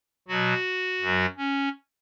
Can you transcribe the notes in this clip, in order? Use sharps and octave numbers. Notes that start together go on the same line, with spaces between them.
B2 F#3 F#4
F#2 F#3
C#4